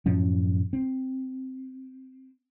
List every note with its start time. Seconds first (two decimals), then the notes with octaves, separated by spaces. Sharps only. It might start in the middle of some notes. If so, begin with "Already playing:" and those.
0.06 F#2 A2 F3 C#4
0.73 C4